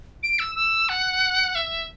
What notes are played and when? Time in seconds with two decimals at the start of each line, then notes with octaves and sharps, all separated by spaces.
0.23 D7
0.39 E6
0.55 E6
0.89 F#5
1.55 E5